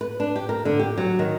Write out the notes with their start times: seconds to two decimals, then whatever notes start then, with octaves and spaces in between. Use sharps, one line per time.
0.01 B4
0.20 D4
0.36 G4
0.49 A#4
0.65 D3
0.79 G4
0.98 F#3
1.19 D#3